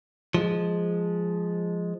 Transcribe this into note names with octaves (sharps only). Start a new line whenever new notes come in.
F3 G#3